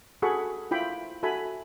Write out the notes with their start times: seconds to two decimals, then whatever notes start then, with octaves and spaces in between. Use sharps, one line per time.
0.22 F#4 G#4 A4 F#5 B5 C#6
0.71 E4 F4 G5 B5
1.23 F#4 A4 E5 G#5 B5